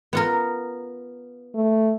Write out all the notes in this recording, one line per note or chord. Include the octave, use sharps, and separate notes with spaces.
B3 F4 A#4
A3